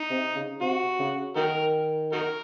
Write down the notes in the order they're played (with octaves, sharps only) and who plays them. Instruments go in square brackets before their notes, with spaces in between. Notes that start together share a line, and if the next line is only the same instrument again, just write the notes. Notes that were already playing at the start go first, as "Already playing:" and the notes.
Already playing: [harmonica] D#4
[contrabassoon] C3
C#3
[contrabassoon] C3 [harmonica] F#4
[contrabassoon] C#3
[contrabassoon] D#3 [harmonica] D#4 F#4 A#4
[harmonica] D#4 F#4 A#4